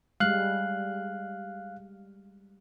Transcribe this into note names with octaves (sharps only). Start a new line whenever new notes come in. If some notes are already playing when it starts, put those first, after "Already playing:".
G3 G#3 F5 F#6